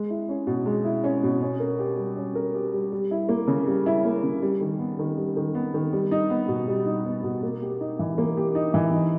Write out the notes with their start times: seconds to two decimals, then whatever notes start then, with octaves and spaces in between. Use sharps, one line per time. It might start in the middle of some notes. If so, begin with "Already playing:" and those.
Already playing: G#3
0.10 E4
0.29 C#4
0.47 B2
0.66 G#3
0.85 E4
1.04 C#4
1.23 B2
1.42 C#4
1.60 A#4
1.79 G4
1.97 G3
2.16 C#4
2.35 A#4
2.55 G4
2.74 G3
2.92 G3
3.11 E4
3.29 A#3
3.48 C#3
3.67 G3
3.86 E4
4.05 A#3
4.23 C#3
4.42 G3
4.61 D#3
4.79 B3
4.99 D#3
5.18 G3
5.37 D#3
5.55 B3
5.74 D#3
5.93 G3
6.11 D#4
6.30 B3
6.48 B2
6.68 G3
6.86 D#4
7.05 B3
7.23 B2
7.43 A#3
7.62 G4
7.80 D#4
7.99 E3
8.18 A#3
8.37 G4
8.55 D#4
8.74 E3
8.94 D#4